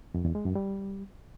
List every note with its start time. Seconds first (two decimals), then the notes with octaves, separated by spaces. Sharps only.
0.14 F2
0.25 E2
0.35 G#3
0.45 F#2
0.55 G3